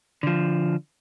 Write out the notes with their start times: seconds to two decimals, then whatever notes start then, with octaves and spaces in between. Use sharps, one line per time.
0.23 D3 F3